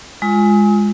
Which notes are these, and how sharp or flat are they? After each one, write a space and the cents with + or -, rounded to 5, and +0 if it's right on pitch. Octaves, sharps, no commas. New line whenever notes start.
G#3 +0 F4 +0 D#6 +45